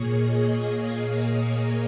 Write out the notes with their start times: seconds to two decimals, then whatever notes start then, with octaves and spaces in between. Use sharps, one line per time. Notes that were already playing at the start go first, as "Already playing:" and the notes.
Already playing: A#2 A#3 G#4 C#5
0.18 D#5
0.54 F5
0.90 D#5
1.27 C#5